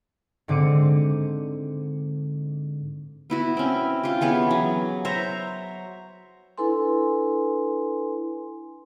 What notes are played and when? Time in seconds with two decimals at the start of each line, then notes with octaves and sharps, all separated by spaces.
0.48 G#2 D3 C4 D6 C#7 D#7
3.30 B3 E4 F#4
3.57 C4 C#4
4.03 F4 G4
4.21 E3 B3 G#4 C#5
4.51 F#3
5.05 C5 C#5 E5 A#5
6.58 D4 E4 A4 B4 G#5 C6